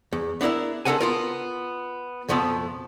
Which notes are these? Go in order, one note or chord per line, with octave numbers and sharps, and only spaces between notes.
E2
B3 D4 E4 A#4 E5
G#3 D4 A4 A#4 F#5 G#5
B3 F4 A#4
B1 F2 F3 A3 B3